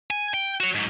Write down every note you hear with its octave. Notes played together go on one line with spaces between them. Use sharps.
G#5
G5
F#4 C#5
G#2 F#3